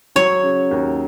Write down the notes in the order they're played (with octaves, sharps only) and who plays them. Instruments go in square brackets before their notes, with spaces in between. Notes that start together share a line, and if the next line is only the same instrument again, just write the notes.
[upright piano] F#3 [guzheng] C#5
[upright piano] C#3
D#2